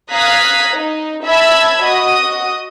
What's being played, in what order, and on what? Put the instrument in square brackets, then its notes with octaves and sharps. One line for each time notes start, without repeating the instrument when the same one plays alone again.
[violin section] F5 A#5 D#6 F#6 G#6 B6
D#4
E5 A5 B5 E6 G#6
F#4 D#5 D#6